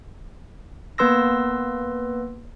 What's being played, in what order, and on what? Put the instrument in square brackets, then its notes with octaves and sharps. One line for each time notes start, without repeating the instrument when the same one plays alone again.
[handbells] A#3 B3 B4 C6 E6 A#6